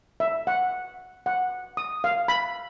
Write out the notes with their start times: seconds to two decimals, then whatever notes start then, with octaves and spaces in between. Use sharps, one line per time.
0.20 E5
0.47 F#5
1.26 F#5
1.77 D#6
2.04 F5
2.28 B5